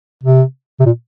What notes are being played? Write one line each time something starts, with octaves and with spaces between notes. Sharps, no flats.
C3
C3
A#2